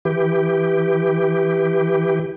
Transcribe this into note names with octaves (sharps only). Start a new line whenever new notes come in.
E3 G4